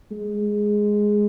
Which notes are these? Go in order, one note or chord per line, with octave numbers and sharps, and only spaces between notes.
G#3